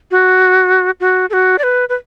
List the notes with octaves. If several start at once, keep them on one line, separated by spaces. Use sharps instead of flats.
F#4
F#4
A4
F#4
D5
B4
B4